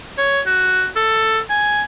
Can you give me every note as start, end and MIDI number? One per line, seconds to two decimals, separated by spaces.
0.18 0.40 73
0.47 0.88 66
0.96 1.39 69
1.50 1.83 80